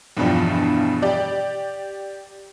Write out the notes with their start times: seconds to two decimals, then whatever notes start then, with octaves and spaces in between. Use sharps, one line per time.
0.17 E2 G2 B2 F3 G3
1.02 G4 D5